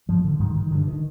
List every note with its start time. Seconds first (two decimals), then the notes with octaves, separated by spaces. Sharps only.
0.09 G#2 F3
0.25 D3
0.40 G#2 D#3
0.56 D#3
0.71 G2 D3
0.87 D3 D#3